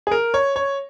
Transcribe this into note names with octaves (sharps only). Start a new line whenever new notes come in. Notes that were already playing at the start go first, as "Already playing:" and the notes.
G#4
A#4
C#5
C#5